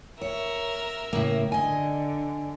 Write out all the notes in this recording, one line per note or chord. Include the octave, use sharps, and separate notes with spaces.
A#4 C#5 E5
A2 C#3 A#3
D3 D#5 G#5